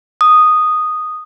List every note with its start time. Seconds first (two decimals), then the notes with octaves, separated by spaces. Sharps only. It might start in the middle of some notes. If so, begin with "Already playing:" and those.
0.21 D#6